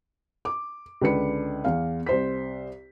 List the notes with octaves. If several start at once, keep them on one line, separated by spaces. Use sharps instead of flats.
D6
C#2 D3 B4 C#7
E2 F5
C2 C5 B6